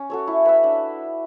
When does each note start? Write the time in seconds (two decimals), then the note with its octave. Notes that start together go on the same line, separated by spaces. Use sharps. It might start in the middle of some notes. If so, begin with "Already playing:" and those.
Already playing: C#4
0.10 F#4 A4 C#5
0.27 E4
0.45 B4 E5
0.64 D4